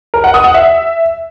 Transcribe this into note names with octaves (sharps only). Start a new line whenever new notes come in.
A#4
F#5
D#6
F#5
E5